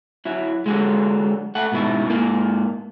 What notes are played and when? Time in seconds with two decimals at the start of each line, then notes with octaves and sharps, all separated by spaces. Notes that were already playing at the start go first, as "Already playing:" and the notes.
0.25 F#3 E4
0.66 D3 F#3 G#3
1.55 A3 F#5
1.72 G#2 B2 D#3 E4
2.06 G#2 A#3